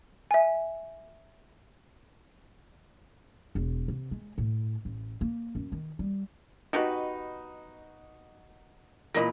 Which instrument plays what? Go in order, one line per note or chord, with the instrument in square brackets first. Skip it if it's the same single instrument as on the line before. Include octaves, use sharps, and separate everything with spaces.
[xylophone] E5 G#5
[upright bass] E1
C3
G#3
A2
A1
A#3
F#2
D#3
G3
[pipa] B2 G4 B4 [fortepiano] D#4 F#4
[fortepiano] A#2 E3 [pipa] A#4 D#5 B5